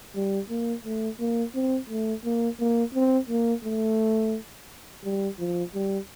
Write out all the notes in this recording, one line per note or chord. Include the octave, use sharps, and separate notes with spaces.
G3
A#3
A3
A#3
C4
A3
A#3
A#3
C4
A#3
A3
G3
F3
G3